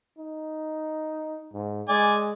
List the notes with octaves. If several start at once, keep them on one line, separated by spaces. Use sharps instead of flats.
D#4
G#2
G#3 D5 G#5